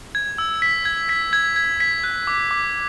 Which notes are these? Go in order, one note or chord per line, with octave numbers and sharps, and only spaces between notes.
G#6
E6
B6
G#6
B6
G#6
G#6
B6
F#6
D6
D6